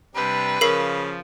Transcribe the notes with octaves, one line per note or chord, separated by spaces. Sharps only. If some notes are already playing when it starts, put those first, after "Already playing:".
C3 G3 D4 B4
C#3 F3 A#4 C7